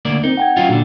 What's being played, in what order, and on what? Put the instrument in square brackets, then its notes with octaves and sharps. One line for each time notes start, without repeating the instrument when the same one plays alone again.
[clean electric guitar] D2 A#3 D5
[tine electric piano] C4 A#4 [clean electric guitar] D#4
[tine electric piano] F#5 G5 G#6
[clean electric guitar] F#3 C#4 F4
[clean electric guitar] A#2 D3 [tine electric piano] D4 F#4